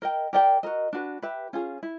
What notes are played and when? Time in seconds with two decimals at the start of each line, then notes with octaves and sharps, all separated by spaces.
0.02 A#4 D#5 G5
0.33 G4 A#4 D5 G5
0.63 F#4 A#4 D#5
0.93 D4 F#4 B4
1.22 G4 B4 E5
1.53 C#4 F4 G#4
1.83 E4